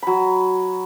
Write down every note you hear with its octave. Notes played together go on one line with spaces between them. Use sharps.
F#3 B5